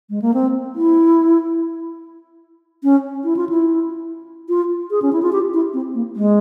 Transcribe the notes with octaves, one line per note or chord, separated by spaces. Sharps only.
G#3
A#3
C4
E4
C#4
E4
F4
E4
F4
G#4
C#4
E4
F4
G4
E4
C4
A#3
G#3